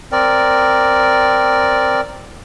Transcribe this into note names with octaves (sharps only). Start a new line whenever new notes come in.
C4 A#4 D5